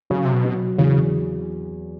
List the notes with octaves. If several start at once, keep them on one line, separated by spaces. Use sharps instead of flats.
C#3 F#3
C3
B2
F#3
E2 C#3